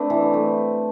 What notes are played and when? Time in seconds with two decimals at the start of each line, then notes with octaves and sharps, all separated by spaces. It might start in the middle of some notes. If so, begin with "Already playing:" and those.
Already playing: A3 C4 D4 B4
0.10 E3
0.34 A3